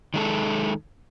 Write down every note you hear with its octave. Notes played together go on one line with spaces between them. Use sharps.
D#3 G#3 A4